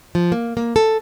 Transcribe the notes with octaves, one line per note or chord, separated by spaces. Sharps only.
F3
A#3
A#3
A4